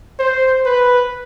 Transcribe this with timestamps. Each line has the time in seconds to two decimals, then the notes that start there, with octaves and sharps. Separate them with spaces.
0.19 C5
0.66 B4